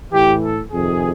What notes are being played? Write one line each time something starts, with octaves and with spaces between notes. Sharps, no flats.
A2 E3 G4
A4
F2 C3 D#3 G#4